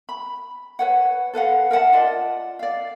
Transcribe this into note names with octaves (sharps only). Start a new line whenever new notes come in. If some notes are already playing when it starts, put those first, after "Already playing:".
B5
B4 C#5 F#5
A4 B4 F5 F#5
A#4 E5 F#5 A5
F4 D5 D#5
D5 F5